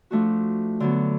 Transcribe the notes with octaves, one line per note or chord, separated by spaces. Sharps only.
F3 A3 D4 F#4
D3 F#3 B3